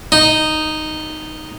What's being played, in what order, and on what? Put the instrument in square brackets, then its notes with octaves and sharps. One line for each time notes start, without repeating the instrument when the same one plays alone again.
[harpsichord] D#4